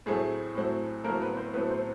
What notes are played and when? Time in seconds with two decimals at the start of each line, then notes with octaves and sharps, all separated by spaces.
0.06 A2 F#3 A3 C4 G#4
0.55 A2 F#3 A3 C4
1.04 A2 F#3 A3 A#3 C4 A#4
1.21 B3 B4
1.37 C4 C5
1.53 A2 F#3 A3 B3 C4 B4
1.70 C4 C5